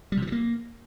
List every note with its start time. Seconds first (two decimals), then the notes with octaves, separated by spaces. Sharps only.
0.12 G3
0.17 C3
0.22 F3
0.27 E3
0.32 A#3